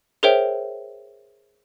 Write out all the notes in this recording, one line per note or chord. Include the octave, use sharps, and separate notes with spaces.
G#4 A#4 C5 C#5 E5 G5